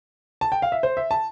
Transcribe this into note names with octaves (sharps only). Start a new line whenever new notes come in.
A5
G5
F5
E5
C5
E5
A5